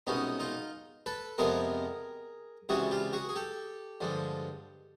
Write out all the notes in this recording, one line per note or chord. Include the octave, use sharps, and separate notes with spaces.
C2 B2 G#3 B3 C#4 D#4
D#4 F4
A4 B4
F2 C3 F3 G#3 B3 G#4 A#4
C#2 C3 E3 G3 F#4 G#4
F4 G4
F#4 G#4
G#4
G4 A4
G2 D3 F3 G#3